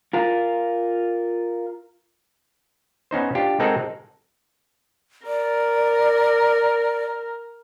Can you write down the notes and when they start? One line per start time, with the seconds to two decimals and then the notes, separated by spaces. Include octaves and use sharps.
0.13 F4 A#4
3.11 B3 C#4 D#4 C5
3.35 D4 F4 G4
3.59 G#3 C4 D#4 A4 A#4 F#5
5.26 A#4 D5